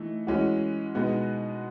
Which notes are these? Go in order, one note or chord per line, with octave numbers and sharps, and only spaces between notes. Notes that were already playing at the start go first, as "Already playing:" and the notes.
Already playing: E3 A3 D#4
E3 G#3 C#4 F#4
B2 G#3 B3 D#4 F#4